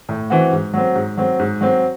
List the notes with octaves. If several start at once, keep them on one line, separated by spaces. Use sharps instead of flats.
A2
E3 C4 F#4
G#2
F#3 C4
G#2
F#3 C4
G#2
F#3 C4